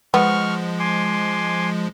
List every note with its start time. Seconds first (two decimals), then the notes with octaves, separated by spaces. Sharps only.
0.14 F3 G#3 B3 C#6 F6
0.79 G#5 C6 D6